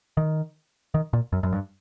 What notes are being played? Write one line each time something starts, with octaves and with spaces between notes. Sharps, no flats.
D#3
D#3
A#2
F#2
F#2
G2